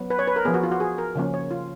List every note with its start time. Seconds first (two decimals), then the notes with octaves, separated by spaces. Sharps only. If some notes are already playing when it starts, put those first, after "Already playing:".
Already playing: F#3 B3
0.10 B4
0.19 C#5
0.27 B4
0.36 A#4
0.45 F3 B3 G#4
0.54 F#4
0.63 F4
0.72 F#4
0.80 G#4
0.98 A#4
1.15 C#3 F3 A#3 C#4
1.34 C#5
1.51 F4